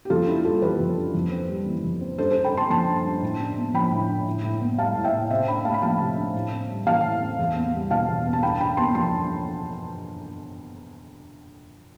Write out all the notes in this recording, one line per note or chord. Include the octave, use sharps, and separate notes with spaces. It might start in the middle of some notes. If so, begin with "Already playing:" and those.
G4
F2 F4 A4
D4 E4 G4
G3 F4 A4
E3 G4 B4
F2
D4
F2
C4
G3
E3
F2
C4
G2 A4 C5
A4 C5
G2
G5 B5
C4 A5 C6
F3 A5 C6
G2
G2
A2
D4
B3
F3 G5 B5
A2
D4
A2
A2
B3
G3 F5 A5
A2
E5 G5
A2
C3 C5 E5
D4 G5 B5
A3 F5 A5
B5
F3 F5 A5
C3
D4
A2
C4
G3
E3 F5 A5
A2
C4
E2
B3
G3
B2 F5 A5
E2
B3
A5
G2 G5 B5
D4 G5 B5
B3 A5 C6
F3 A5 C6
G2